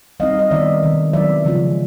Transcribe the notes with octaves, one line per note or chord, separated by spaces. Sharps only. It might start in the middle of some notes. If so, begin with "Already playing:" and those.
G3 C4 D#4 D#5 F5
D#5
D#3 G3 B3 D#4 D5 E5
C3 D#3 G#3
F#3 B3 D#4 D5 E5
C#3 F3 G#3 C#4 F4